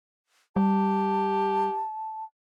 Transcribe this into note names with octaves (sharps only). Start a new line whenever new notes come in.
G3 G4 A5